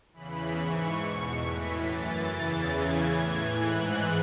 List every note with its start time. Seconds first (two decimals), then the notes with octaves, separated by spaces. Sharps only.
0.13 E2 C#3 E3 B5
0.56 G#2 E3 C#6
0.99 E2 B2
1.42 A2 E3 B6
1.84 F#2 E3 A6
2.27 E2 C#3 E3
2.69 E2 C#3 E3 G#6
3.12 A2 E3
3.54 G#2 E3 F#6